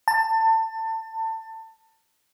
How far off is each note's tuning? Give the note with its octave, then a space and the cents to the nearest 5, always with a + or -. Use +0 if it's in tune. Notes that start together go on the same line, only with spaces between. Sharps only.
A5 +25